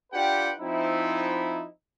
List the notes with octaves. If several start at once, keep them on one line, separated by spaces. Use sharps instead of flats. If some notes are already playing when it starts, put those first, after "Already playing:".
D4 F4 G4 B4 F#5 G5
F3 C4 D#4 E4